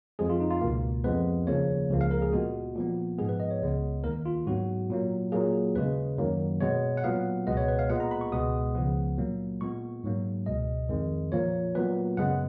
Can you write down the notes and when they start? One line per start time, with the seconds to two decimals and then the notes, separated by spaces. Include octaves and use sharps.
0.19 F2 F3 G#3 G#4
0.30 F4
0.40 D#4
0.50 F4
0.61 C#2 B2 A#3
1.04 F2 F3 G#3 B3 B4
1.47 D#2 C#3 F3 A#3 C#5
1.90 C#2 C#3 F3 A#3
2.01 F5
2.11 A#4
2.22 G#4
2.33 A#2 G#3 B3 F#4
2.75 A#2 F3 B3
3.18 G#2 F3 G#3 B3 G#4
3.29 B4
3.40 D#5
3.51 C#5
3.61 C#2 C#3 G#3 B3
4.04 D#2 D#3 A#3 A#4
4.25 F4
4.47 G#2 F#3 B3 F#4
4.90 A#2 F#3 A#3
5.32 A#2 F#3 A#3 G#4
5.75 D#2 C#3 G#3 B4
6.18 F#2 D#3 F#3 A#3
6.61 B2 G#3 B3 C#5
6.97 F#5
7.04 A#2 F#3 B3 F5
7.47 C#2 B2 G#3 B3 D#5
7.57 C#5
7.68 B4
7.79 F5
7.89 A#2 G#3 B3 F#5
8.00 A#5
8.11 B5
8.21 C#6
8.32 C#2 B2 G#3 B3 D#6
8.75 C#2 C#3 F3 B3
9.18 A#2 F#3 A#3
9.61 A#2 G#3 B3 C#6
10.04 G#2 F#3 A#3
10.46 C#2 B2 G#3 D#5
10.89 F2 D#3 G#3
11.32 A#2 F3 A#3 C#5
11.75 A#2 F#3 B3 B4
12.17 F#2 C#3 G#3 B3 F#5